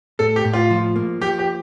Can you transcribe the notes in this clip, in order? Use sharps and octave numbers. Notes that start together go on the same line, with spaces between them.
A2 A4
G4
A2
F4
F3
A#3
F3 G4
G4